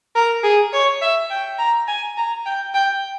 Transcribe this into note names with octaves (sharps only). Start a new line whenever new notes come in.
A#4
G#4
C#5
E5
G5
A#5
G#5
A#5
G5
G5